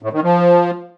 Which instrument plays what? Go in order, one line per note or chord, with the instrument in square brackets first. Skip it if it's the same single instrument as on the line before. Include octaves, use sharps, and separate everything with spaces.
[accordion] A2
D#3
F3